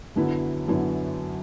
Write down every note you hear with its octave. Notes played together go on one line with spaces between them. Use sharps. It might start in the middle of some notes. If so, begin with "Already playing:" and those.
F#2 D3 F#3 B3 E4
F#2 D3 F#3 B3 E4